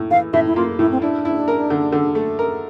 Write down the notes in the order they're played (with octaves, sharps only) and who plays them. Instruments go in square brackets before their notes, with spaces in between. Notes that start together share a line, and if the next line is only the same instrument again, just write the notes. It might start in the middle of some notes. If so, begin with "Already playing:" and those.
Already playing: [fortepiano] A2
[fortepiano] E3 [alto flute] F5
[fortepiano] A2 [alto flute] E5
[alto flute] E4
[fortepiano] A#3 [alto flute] F4
[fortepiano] A2 [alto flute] E4
[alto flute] C4
[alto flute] D4 [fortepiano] E4
[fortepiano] E4
A#4
D3
D3
A3
A#4